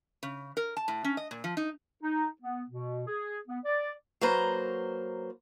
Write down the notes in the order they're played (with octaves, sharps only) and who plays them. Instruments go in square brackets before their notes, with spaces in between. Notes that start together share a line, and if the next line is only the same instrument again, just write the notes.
[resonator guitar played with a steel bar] C#3
A#4
A5
A2
C#4
D#5
A#2
F3
D#4
[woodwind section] D#4
B3
B2
G#4
B3
D5
[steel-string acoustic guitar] F#3 A#3 B4 C5 A#5